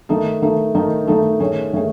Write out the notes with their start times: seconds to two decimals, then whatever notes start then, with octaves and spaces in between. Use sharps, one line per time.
0.09 D#3 A3 D#4 A4
0.42 D#3 A3 D#4 A4
0.75 D#3 A3 D#4 A4
1.07 D#3 A3 D#4 A4
1.40 D#3 A3 C#4 G#4 C#5
1.73 D#3 A3 C#4 G#4 C#5